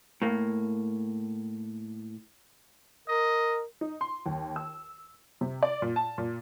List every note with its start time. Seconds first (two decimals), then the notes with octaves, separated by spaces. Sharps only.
0.22 A2 A#3
3.08 A#4 D#5
3.81 D#4
4.01 C6
4.26 D#2
4.56 E6
5.41 C3
5.63 D5
5.82 A#2
5.96 A5
6.18 A#2